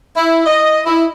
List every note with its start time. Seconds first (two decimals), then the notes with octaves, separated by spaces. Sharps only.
0.16 E4
0.46 D#5
0.86 E4